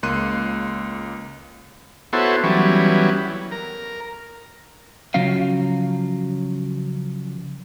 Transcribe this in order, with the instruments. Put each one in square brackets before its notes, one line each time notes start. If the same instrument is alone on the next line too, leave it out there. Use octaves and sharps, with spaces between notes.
[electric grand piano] C#2 A#3 C6 F#6 D#7
[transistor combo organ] B3 E4 F#4 A4 C5 C#5
E3 F#3 G3 B3 C#4
A#4
[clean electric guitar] C#3 F3 F#3 C#4 F5